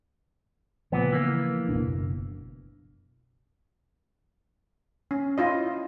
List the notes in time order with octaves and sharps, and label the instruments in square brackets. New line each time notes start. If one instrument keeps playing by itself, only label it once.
[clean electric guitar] A#2 B3 [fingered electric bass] C#3 F3
[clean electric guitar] E3 A#3
[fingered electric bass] F#1 B2 D4
[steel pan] C#4
E4 F4 D#5